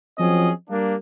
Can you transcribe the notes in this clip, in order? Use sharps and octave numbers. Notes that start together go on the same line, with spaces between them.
F3 F#3 C4 C#4 G#4 D#5
G3 A#3 D4